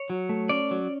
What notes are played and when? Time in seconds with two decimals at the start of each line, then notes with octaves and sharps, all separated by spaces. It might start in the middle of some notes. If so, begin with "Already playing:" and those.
Already playing: C#5
0.10 F#3
0.29 A3
0.49 C#4 D5
0.71 F#3